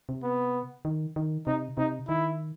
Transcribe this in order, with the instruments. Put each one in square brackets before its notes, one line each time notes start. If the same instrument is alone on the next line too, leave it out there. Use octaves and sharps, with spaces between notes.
[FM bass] C3
[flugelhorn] B3
[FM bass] D#3
D#3
[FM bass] C3 [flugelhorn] D#4
[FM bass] C3 [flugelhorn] D#4
[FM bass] D#3 [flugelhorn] E4